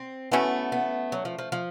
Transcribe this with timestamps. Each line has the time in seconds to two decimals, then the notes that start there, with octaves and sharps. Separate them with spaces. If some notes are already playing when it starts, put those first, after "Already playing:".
Already playing: C4
0.32 E3 A3 B3 C#4 F#4
0.72 B3
1.12 F#3
1.25 F3
1.39 F3
1.52 F3